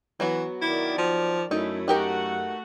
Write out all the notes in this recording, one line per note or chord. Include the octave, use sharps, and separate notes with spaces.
E3 F#3 B3 F#4
D#3 E4 D5
F3
F#2 A3 C#4 D#4 E4
A3 D#4 F#4 G4 A#4 F#5